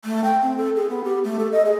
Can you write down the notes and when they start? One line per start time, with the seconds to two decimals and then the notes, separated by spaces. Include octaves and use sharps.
0.05 A3
0.24 G5
0.42 C4
0.57 A4
0.76 G#4
0.89 B3
1.04 G4
1.24 A3
1.39 A4
1.52 D#5
1.65 G#4